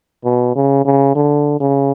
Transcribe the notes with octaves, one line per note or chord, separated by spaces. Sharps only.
B2
C#3
C#3
D3
C#3